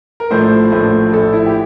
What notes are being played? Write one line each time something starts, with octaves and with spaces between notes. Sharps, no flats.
A#4
A#1 A2 F3 A3 C5
A#1 A2 F3 A3
A#1 A2 F3 A3 A4
E4
G4